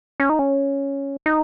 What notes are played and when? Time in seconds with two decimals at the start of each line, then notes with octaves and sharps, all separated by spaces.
0.20 C#4
0.29 D#4
0.39 C#4
1.26 D#4